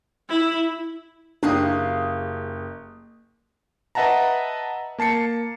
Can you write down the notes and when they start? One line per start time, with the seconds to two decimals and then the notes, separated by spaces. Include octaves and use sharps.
0.29 E4
1.43 F#1 D4 G4 G#4 F5 D#6 F#6
3.95 B4 D#5 E5 F#5 A5 A#5
4.98 A#3 A5 C7 C#7